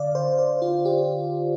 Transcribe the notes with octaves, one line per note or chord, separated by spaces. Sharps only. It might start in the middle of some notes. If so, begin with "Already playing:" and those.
Already playing: D3 D5 F5
C5
C5
F4
G4